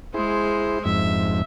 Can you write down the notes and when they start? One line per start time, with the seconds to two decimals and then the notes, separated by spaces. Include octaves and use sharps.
0.14 G#3 E4 G#4 C5
0.85 F2 G#2 E5